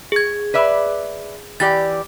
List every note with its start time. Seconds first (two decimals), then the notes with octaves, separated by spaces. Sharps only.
0.12 G#4 G#6
0.54 B4 D5 E5
1.60 E3 G4 D5 A6